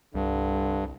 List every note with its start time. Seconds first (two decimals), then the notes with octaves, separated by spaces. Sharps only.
0.15 C2 G2 D3